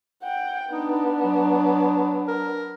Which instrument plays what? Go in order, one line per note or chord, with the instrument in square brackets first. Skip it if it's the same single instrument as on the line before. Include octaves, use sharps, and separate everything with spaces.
[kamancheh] F#5 G5
[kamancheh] B3 D4 [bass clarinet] D#4
[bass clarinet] F#3
A#4